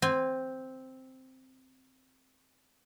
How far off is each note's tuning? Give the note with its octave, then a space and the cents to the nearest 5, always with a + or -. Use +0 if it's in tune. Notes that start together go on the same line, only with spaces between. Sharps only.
C4 +0 G#5 -25